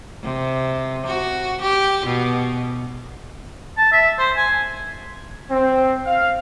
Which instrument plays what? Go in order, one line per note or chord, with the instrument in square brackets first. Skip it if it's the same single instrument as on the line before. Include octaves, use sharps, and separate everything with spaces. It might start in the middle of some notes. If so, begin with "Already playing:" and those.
[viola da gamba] C3
F#4
G4
B2
[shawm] A5
E5
C5
G#5
[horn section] C4
F5